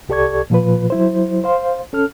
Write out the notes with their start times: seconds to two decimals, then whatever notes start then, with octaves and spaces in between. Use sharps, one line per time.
0.09 C2 G4 A4 D5 C#6 G#6
0.50 A#2 F3 F4 B4
0.90 F#3 E4 C5
1.44 C5 F5 C6
1.93 C#4 A4 F6